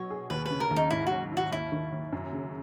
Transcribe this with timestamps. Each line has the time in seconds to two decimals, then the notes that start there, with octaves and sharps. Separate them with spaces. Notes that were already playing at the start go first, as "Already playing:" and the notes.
Already playing: B2 F#3 C#5
0.10 G#4
0.30 D#2 B4
0.46 C#3 B4
0.60 A#4
0.71 D#2
0.76 D#4
0.90 G#2 E4
1.07 F#3 F#4
1.31 E4
1.37 F#4
1.51 D#2 E4
1.72 D#3
1.92 D#2
2.12 F#2
2.33 C#3